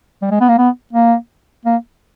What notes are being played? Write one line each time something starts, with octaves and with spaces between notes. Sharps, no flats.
G3
G#3
B3
A#3
B3
A#3
A#3